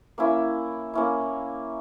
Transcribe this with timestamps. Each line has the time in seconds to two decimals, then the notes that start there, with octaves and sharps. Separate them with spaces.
0.18 A#3 C#4 E4
0.94 A#3 C#4 E4